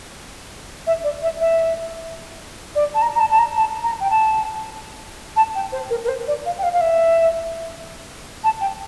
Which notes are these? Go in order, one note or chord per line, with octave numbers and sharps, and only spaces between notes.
E5
D5
E5
E5
D5
A5
A#5
A#5
A5
A5
A#5
A5
A#5
G5
A5
A5
G5
C5
A#4
A#4
C5
D5
F5
G5
F5
F5
E5
A5
G5